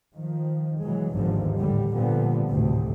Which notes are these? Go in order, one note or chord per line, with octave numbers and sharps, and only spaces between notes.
D#3 F3
B2 E3 F#3 G#3
G1 D#2 G#2 D3 F3
A2 D3 G3
A#2 D3 F3 G3 B3
G#1 D2 A2 C3